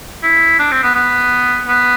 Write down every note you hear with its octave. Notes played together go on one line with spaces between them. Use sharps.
E4
D4
C4
B3
B3
B3